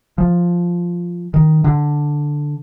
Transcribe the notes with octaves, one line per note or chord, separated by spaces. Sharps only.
F3
D#3
D3